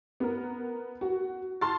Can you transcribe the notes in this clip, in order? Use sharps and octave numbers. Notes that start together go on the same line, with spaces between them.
B3 A#4
F#4
A5 C6 C#6 F6 A6